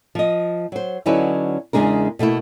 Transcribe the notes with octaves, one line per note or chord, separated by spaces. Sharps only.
F3 D#5
F#3 C5
D3 F#3 C#4 D#4 E4 B4
E2 C#3 G#3 D4 A#4
B2 A3 A#3 E4